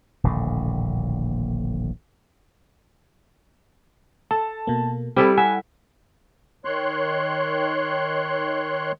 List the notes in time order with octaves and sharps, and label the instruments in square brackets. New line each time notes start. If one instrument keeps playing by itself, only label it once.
[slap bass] D#1 A#1 A2 D3
[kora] A4 [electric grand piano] A5
[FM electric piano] B2 A#3
[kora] G3 E4 A4 [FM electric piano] C4 [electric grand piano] G4
[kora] E5 [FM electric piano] F#5 [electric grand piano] G#5
[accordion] D#3 C#5 C6 F#6